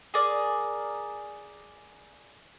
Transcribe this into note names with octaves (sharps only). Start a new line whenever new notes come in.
G#4 A#4 D5